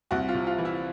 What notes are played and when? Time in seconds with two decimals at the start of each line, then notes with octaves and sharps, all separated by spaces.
0.11 C2 F#4
0.29 F4
0.35 C3
0.47 F4
0.58 E3
0.65 E4